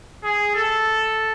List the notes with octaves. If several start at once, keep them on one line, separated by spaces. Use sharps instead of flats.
G#4
A4